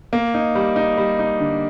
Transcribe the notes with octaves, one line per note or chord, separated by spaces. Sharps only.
A#3
D#4
G3
D#4
G3
D#4
D3